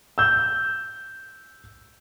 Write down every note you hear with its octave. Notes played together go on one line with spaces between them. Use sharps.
E6 G6